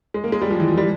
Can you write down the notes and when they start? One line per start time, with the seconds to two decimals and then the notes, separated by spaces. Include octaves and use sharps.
0.14 G#3
0.24 A#3
0.32 G#3
0.42 G3
0.50 F3
0.60 E3
0.68 F3
0.77 G3